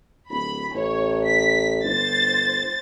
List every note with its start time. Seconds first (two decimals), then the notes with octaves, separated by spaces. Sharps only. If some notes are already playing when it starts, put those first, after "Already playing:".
0.30 D1 B5
0.74 A1 C#5
1.24 B6
1.84 G1 C5 A6